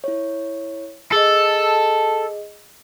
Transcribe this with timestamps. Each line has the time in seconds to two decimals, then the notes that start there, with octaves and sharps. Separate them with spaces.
0.04 E4 C#5
1.12 G#4 A4 D#5